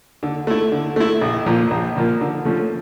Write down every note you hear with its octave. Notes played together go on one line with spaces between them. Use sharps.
D3
A3 E4
D3
A3 E4
A#1
A#2 F3 A#3
A#1
A#2 F3 A#3
D3
F3 A3 C#4